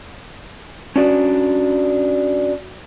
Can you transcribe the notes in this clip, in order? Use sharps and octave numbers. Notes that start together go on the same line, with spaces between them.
C#4 D4 F#4 D5